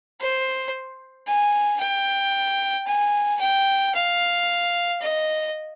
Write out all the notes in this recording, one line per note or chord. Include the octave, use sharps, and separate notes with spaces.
C5
G#5
G5
G#5
G5
F5
D#5